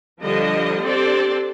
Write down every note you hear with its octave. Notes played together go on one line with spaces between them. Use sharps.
D3 F3 G3 D#5
C4 D4 G4 A4 C5 D5